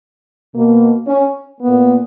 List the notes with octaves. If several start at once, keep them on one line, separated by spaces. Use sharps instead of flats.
B2 A#3
C#4
A#2 A#3 B3